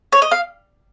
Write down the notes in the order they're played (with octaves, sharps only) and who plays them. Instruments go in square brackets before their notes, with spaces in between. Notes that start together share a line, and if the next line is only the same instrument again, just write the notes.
[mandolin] C#5
D#5
F5